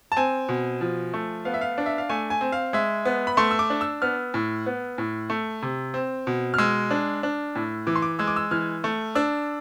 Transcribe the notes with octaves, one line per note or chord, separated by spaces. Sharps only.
A5
C4 G#5
B2
F3
A3
B3 F5
E5
F5
D4
E5
F5
A3 G#5
G#5
C4
F5
G#3 E5
B3
B5
A3 C6
E6
D6
D4
E6
B3 F6
A2
B3
A2
A3
C3
C4
B2
F6
G#3 E6
D4
D4
A2
E3 D6
C6
D6
G#3 E6
D6
E6
E3 F6
A3
D4 E6